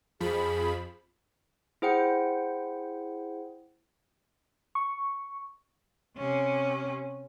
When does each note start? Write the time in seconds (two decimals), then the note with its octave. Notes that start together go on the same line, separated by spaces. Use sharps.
0.20 F2 F3 G#4 B5
1.82 E4 G#4 C5 F#5 G5 C#7
4.75 C#6
6.17 C3 C#4